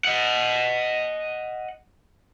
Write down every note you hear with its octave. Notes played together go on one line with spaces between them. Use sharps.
D#5 F#5